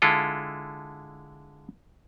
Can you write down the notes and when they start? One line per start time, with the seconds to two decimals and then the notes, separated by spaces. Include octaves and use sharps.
0.02 D3 G#3 E4 F4 A4